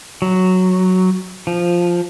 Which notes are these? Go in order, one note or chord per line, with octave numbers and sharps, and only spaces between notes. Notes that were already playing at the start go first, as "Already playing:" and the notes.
F#3
F3